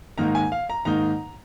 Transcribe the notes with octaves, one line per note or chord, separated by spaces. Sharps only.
G#2 D#3 A#3 D#4 A#5
G#5
F5
A#5
G#2 D#3 A#3 D#4 A#5